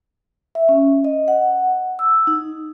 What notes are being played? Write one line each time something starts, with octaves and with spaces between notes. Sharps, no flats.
E5
C#4
D#5
F#5
E6
D#4